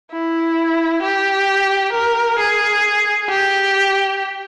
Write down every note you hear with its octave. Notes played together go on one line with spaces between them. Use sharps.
E4
G4
A#4
G#4
G4